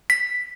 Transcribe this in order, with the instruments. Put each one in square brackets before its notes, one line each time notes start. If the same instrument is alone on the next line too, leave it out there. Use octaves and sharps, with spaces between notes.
[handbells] B6